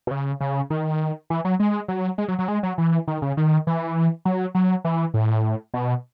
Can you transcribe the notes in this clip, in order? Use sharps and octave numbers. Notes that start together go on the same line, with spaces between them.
B2
C#3
C#3
D#3
E3
F#3
G#3
F#3
G#3
F#3
F#3
G#3
F#3
E3
D#3
C#3
D#3
E3
F#3
F#3
E3
A2
B2